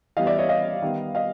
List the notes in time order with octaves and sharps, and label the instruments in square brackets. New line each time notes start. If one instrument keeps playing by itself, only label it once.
[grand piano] E3 G3 B3 D#5 F5
D5 E5
C#5 D#5
D#5 F5
D#3 G3 B3
D#5 F5